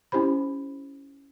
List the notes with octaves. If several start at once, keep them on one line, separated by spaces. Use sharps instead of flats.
C#4 E4 G4 C5 B5